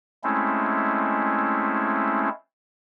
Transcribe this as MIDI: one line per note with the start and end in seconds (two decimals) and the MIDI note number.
0.24 2.29 56
0.24 2.29 57
0.24 2.29 60
0.24 2.29 61
0.24 2.29 64